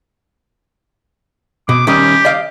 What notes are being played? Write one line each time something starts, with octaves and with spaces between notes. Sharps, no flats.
B2 D6
D#3 G3 C#4 G4
D5 D#5 F5